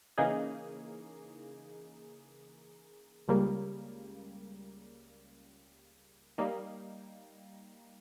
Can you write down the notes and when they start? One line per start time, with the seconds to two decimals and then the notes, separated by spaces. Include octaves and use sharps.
0.18 C#3 E3 A#3 D#4 G#4
3.28 C#2 C#3 G3 A#3
6.38 G3 A#3 D#4